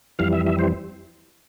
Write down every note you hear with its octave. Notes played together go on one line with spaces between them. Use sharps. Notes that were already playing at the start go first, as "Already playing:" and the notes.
F2 E3 G3 F5
E5
E5
C5